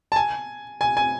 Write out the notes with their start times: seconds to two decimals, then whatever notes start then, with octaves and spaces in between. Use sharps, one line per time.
0.12 A5
0.16 G#5
0.81 G#5
0.97 G#5